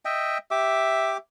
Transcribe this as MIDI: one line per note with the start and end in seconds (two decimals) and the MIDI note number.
0.05 0.38 75
0.05 0.38 76
0.05 0.38 79
0.51 1.17 67
0.51 1.17 76
0.51 1.17 86